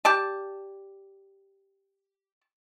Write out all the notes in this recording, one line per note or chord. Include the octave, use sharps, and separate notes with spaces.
G4 D5 A5